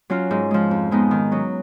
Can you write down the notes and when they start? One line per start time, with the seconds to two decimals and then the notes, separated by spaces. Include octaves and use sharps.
0.10 F#3 C#4 F4
0.31 G#2
0.51 F3 G#3
0.71 F2
0.91 F3 G#3 B3 D#4
1.11 D#3
1.31 F#3 C#4